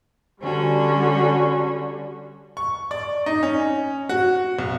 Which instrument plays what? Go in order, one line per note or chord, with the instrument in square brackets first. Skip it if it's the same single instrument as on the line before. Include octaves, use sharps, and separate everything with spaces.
[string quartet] D3 G3 C#4 F#4
[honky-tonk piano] C#6
D5
D#4
C#4
F#4
B1